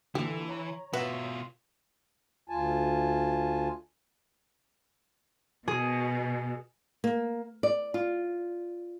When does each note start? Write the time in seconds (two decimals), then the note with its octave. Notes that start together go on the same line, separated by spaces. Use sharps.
0.15 A#2 D3 E3 G4
0.48 C#5 A#5
0.93 B2 F4 F#4 B4 E5
2.49 D2 F4 G#5 A5
5.68 B2 G#4
7.04 A#3
7.63 D5
7.94 F4